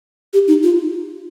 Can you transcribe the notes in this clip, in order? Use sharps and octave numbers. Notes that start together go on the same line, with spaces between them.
G4
D#4
F4